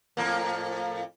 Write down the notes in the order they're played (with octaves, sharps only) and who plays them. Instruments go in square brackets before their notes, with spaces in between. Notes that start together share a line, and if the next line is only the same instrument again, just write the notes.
[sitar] F2 A2 A#3